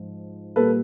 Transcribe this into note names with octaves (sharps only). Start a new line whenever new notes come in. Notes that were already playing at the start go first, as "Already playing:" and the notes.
Already playing: G#2 F3
A#2 G3 A#3 A4 B4